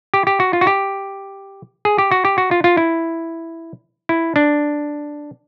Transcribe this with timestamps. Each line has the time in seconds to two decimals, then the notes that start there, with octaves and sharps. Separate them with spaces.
0.14 G4
0.27 G4
0.40 F#4
0.53 F4
0.61 F#4
0.67 G4
1.85 G#4
1.98 G4
2.11 F#4
2.25 G4
2.38 F#4
2.51 F4
2.64 F4
2.77 E4
4.09 E4
4.36 D4